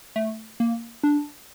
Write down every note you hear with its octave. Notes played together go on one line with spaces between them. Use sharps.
A3
A#3
D4